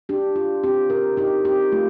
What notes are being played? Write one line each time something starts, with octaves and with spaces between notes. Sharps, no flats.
D4 G4
F4
C4 G4
C4 A#4
D#4 G4
C4 G4
A3 F4